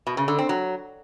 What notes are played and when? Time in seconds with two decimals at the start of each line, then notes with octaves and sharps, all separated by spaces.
0.07 B2
0.17 C#3
0.28 D3
0.39 C4
0.49 F#3